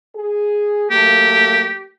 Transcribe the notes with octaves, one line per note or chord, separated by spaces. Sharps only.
G#4
F#3 A3 A#3 G4